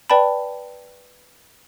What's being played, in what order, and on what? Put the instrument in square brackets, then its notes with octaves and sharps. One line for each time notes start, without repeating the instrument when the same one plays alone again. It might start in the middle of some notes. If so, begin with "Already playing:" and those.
[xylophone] B4 D5 G5 A5 B5